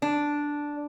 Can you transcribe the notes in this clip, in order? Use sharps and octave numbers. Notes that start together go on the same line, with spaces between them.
D4